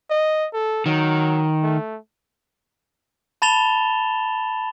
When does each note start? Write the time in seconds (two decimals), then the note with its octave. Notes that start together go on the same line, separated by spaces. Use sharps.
0.10 D#5
0.53 A4
0.86 D#3 F#3
1.63 A3
3.42 A5 B5 A6 E7 F7 G7